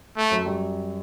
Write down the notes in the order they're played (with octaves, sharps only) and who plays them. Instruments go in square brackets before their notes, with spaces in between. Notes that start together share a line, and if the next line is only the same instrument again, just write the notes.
[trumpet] A3
[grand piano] F#2 F#3
G3